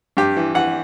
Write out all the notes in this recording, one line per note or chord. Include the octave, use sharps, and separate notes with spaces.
G2 G4
E3
E3 F#5